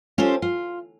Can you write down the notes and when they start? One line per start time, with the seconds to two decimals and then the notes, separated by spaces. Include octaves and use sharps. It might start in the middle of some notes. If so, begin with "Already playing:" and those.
0.18 C#4 F4 G4 A4 C5
0.42 F4